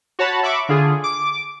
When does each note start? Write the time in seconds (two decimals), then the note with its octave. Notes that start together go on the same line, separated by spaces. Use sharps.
0.19 F#4 C#5 A5 B5
0.43 E5 B5 C#6 D6
0.69 D3 F4 G#4
1.04 D6